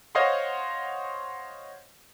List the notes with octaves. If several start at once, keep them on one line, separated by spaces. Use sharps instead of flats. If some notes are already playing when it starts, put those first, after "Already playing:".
C5 C#5 D#5 F5 F#5 C6